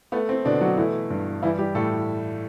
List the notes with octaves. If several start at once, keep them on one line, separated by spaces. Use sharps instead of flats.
A3 B3
C4
B2 D3 D4
F#3 F#4
E3 A3 E4
G2
E3 G3 E4
G3 G4
A2 A3 A4